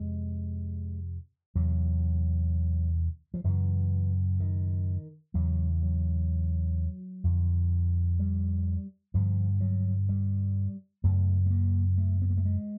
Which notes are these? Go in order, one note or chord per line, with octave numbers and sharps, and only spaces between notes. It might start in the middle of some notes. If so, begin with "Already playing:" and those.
Already playing: F2 C3 G#3
E2 C3 F#3
F3
F#2 C#3 E3
D#3
E2 C#3 F#3
F#3
F2 D3
G3
G2 D3 F3
F#3
G3
F#2 C#3 A3
A3
A#3
A3
B3
A#3
A3
G#3